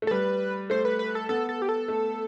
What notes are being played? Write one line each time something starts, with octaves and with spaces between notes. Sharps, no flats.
A3
A4
G3 B4
A3 C5
B4
B4
A4
B3 A4
A4
G4
A4
A3